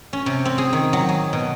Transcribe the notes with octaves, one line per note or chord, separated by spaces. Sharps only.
C#4
C3
C4
G#4
D#3
F#3
G#4
B2